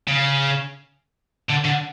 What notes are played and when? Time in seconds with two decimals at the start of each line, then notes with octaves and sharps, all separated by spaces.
0.08 C#3
1.49 D3
1.65 D3